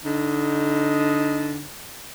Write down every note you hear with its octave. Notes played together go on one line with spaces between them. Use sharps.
D3 D#4